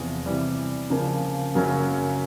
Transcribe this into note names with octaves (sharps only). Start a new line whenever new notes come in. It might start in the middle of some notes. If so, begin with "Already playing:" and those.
Already playing: E2 C3 F3
C3 E3 G3
C#3 F3 A#3
F#2 C#3 F#3 A#3 C#4